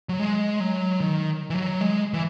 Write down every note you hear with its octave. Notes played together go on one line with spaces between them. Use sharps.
F#3
G#3
F#3
D#3
E3
F#3
G#3
E3